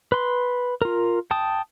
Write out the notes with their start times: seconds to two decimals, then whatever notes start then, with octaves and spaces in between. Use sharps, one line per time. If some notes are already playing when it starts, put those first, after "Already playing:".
0.12 B4 C6
0.82 F4 A#4
1.31 G5 A5 D#6